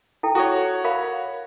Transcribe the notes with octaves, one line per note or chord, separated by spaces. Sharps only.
E4 A4 G5
E4 F#4 A4 C#5 C#6
A#4 F5 B5